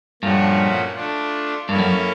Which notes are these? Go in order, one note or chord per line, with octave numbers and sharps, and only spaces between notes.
G2 A#2 F3 A3 C#4 F#4
A3 D4 F4
G2 A#3 C#4 E4 A4 C#5
F#2